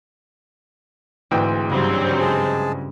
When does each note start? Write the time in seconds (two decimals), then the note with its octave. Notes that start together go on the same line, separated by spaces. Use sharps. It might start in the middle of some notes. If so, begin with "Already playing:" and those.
1.31 D2 G#2 E3 C4 G5
1.69 G2 C#3 F#3 G3 C4
2.21 G#3 G#4 A5